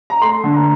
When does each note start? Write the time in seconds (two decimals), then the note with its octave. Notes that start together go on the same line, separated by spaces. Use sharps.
0.10 A#5
0.21 A3 C6
0.44 D3
0.54 A#5